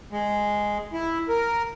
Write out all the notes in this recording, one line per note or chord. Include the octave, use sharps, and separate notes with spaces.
G#3
E4
A#4